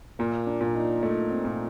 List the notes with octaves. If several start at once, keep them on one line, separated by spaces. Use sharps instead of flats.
A#2 A#3
D4
A#2
D#4
A3 D#4
C4
A#2